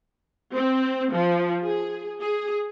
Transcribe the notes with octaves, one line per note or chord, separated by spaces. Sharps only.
C4
F3
G#4
G#4